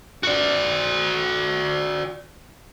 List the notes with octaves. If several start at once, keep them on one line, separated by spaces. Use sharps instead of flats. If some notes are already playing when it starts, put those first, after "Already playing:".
F#4 D5